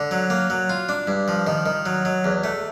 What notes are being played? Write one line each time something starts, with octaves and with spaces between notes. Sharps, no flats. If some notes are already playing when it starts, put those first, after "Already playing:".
Already playing: D3
F#3
A#3
F#3
F4
D4
G2
F3
D#3
D#3
F#3
F#3
E2
A3